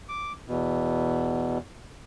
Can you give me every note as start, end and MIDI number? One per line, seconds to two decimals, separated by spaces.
0.09 0.32 86
0.48 1.58 40
0.48 1.58 47